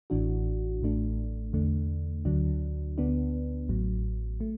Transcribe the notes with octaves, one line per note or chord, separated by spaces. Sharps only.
A1 A2 E3 D4 F#4
A1 A2 A3 D4
E2 D3 A3 D4
D2 D3 F#3 D4
D2 D3 B3 D4
A1 A2 F#3
A3